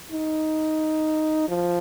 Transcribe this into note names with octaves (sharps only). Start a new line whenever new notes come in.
D#4
F3